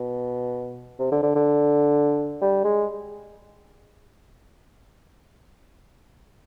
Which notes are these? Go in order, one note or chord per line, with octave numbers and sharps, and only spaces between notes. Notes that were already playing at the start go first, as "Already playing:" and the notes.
Already playing: B2
C3
D3
D3
D3
G3
G#3